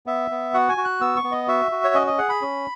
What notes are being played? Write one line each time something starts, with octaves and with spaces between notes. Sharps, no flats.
B3 E5
B3
F#4 F#5
G#5
F#4
F#6
B3 E6
C#6
B3
D#5
F#4 E5
F#4
C#5
C#4 D#5
D#5
G#4 F#5
B5
C#4